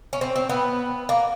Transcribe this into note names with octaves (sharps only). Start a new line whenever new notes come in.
C#4
C4
C4
B3
A#3